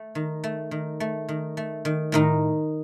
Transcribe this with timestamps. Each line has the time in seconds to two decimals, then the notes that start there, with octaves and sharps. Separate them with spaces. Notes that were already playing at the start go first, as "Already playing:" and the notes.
Already playing: A3
0.15 D#3
0.44 A3
0.71 D#3
1.00 A3
1.29 D#3
1.57 A3
1.85 D#3
2.12 A2 D#3 D#4